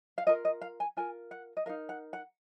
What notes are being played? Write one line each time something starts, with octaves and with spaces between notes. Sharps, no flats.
F5
F4 A#4 D#5
D#5
F5
G#5
F4 A#4 G#5
F#5
D#5
D#4 A#4 F5
F#5
F#5